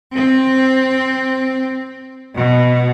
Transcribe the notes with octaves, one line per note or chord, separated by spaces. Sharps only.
C4
B2